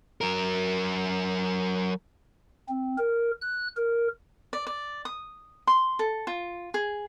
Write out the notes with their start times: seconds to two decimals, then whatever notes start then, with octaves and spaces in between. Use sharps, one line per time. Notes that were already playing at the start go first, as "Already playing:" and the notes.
0.21 F#3 A#4
2.68 C4
2.98 A#4
3.41 F#6
3.77 A#4
4.53 D5
4.67 D5
5.05 D#6
5.67 C6
5.99 A4
6.27 F4
6.74 G#4